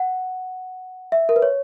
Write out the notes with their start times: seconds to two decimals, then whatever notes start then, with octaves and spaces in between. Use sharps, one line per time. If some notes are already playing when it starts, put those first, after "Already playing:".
Already playing: F#5
1.12 E5
1.29 A#4
1.36 B4
1.42 C#5